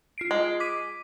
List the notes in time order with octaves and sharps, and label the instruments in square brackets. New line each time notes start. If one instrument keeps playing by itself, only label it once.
[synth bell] F4 C7 D7
[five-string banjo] G#3
[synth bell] D6 B6 D#7